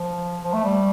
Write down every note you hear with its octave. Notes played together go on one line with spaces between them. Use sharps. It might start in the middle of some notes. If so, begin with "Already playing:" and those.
Already playing: F3
F3
A3
G3